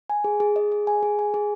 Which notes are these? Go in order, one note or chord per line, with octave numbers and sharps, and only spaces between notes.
G#5
G#4
G#4
D#5
G#4
G#5
G#4
G#5
G#4